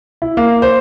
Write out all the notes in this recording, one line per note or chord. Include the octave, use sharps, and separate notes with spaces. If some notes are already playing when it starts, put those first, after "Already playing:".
E4
A#3
C5